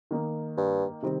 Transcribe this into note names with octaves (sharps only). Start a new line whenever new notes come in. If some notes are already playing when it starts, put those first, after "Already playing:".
D#3 A#3 D#4
G2
C3 D#3 G3 C4